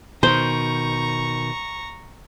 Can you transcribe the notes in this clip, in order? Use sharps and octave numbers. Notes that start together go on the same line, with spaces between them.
B2 D#3 C5 A#5 C#6